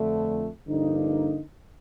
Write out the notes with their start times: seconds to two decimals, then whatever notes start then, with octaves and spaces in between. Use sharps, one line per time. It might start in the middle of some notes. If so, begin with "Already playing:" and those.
Already playing: F2 D3 A3
0.66 G2 D3 F3 A#3 D#4